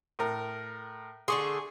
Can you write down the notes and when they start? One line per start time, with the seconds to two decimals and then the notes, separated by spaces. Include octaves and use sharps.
0.19 A2 A#4
1.28 D3 A3 G#4 C6 C#6